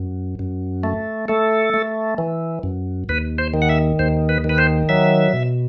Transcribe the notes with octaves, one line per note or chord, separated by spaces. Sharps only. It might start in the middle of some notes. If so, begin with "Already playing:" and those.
Already playing: F#2
F#2
A3
A3 A4
A3
E3
F#2
D#2 B4
C5
D#3
F#5
E5
D#2 C5
B4
D#3
B4
C5
F#3 E5
B2